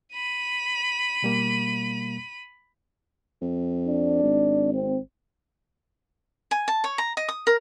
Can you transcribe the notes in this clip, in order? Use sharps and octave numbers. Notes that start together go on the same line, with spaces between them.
B5 D#7
B2 G3 A#3
F2
D4
G#1
C4
G#5
A5
C#5
A#5
D#5
D#6
A#4